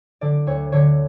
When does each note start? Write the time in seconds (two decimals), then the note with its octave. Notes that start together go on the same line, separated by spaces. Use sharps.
0.21 D3 D5
0.47 D2 C#5
0.72 D3 C#5